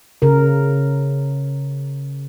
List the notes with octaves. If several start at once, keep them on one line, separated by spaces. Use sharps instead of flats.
C#3 A#4